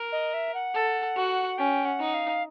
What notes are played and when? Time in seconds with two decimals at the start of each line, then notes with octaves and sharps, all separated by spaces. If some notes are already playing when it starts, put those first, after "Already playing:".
Already playing: A#4
0.12 D#5
0.34 E5
0.54 F#5
0.74 A4
1.16 F#4
1.58 C#4 G5
1.85 F#5
1.99 D#4
2.14 F5